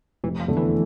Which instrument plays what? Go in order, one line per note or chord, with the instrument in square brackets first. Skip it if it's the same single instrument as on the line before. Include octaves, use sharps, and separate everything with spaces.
[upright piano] F1 [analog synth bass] E3
[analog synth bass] F3
[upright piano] E2 D3 A3
[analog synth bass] E3